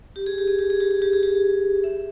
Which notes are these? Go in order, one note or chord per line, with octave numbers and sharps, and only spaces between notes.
G4
G#4
G4
G#4
G4
G#4
G4
G#4
G4
G#4
G4
E5